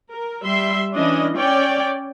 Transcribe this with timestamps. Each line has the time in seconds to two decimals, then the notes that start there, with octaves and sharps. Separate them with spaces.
0.12 A#4
0.44 G3 E5 C6
0.93 E3 C#4 D4 D#5
1.36 C#4 C#5 D5 G5